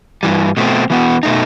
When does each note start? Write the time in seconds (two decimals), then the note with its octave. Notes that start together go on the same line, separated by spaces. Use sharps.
0.23 G2 E3 G3
0.57 B2 A3 C4
0.90 E3 B3 F#4
1.23 B2 A3 D#4